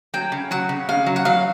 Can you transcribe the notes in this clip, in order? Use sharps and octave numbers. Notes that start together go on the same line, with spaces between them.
F#3 G5
C#3
F#3 F#5
C#3
C#3 F5
F#3
F#5
F#3 F5